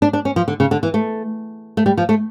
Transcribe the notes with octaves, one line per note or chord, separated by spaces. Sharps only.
D4
D4
C#4
F3
D3
C#3
D3
E3
A3
A3
G3
F3
A3